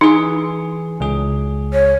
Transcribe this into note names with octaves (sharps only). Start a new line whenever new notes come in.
E3 D#4 G#4
C#2 G#4
C#5